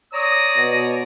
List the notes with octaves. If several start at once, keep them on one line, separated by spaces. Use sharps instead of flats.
C#5 D5 A#5 D#6 A#6
B2